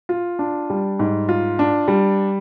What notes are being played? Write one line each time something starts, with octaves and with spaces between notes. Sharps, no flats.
F4
D4
G3
G#2
F4
D4
G3